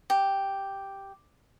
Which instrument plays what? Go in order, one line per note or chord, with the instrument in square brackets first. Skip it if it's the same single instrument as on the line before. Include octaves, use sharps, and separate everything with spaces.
[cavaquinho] G4